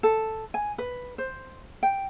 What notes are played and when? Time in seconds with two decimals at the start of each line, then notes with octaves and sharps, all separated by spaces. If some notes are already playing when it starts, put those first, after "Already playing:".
0.03 A4
0.54 G#5
0.78 B4
1.18 C5
1.83 G5